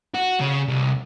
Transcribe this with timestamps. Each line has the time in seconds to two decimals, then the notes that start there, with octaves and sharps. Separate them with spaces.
0.14 F#4
0.40 C#3
0.68 C2